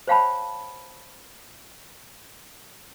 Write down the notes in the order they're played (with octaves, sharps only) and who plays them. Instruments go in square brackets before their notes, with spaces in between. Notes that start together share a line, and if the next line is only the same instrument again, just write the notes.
[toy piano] C5 C#5 F5 G5 A5 B5